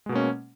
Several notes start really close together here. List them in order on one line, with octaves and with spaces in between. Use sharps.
G#3 B2 A#3 C#4